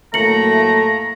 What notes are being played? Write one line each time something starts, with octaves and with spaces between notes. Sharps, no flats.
A2 F#3 A3 A#3 A#5 A#6 C#7 F#7